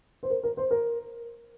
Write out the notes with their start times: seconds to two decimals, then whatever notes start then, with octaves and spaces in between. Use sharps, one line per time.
0.23 C5
0.30 A#4
0.43 A#4
0.57 C5
0.71 A#4